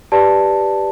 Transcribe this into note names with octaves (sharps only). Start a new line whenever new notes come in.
G4 B4 D5 A5